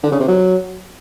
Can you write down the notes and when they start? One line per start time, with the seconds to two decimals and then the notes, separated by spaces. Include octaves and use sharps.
0.03 D3
0.12 C#3
0.20 C3
0.28 F#3